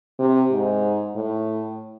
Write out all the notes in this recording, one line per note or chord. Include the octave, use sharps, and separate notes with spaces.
C3
G#2
A2